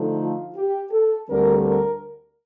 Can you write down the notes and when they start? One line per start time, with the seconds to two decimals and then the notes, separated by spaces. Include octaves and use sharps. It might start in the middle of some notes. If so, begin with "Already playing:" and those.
Already playing: D3 F3 A3 D#4
0.19 F4
0.56 G4
0.92 A4
1.28 D2 D3 G3 C4 A#4
1.65 A#4